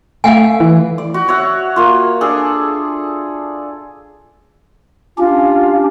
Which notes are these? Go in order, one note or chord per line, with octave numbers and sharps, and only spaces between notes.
A3 F5 F#5 G#5
E3
D5
F#4
F#4 C#5 E5 F#5
A#3 F4
D4 G#4 A4
C#4 D4 F4 G4